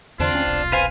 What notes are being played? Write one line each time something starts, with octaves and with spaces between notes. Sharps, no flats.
E2 D3 C4 D4 F4
D2 C#4
D#1 B1
C4 B4 F5 G#5